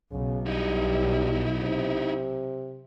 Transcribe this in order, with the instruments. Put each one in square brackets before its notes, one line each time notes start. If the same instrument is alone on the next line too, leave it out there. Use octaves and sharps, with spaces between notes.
[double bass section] B1 [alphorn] C#3
[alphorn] G3 [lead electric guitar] D#4 E4
[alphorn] C3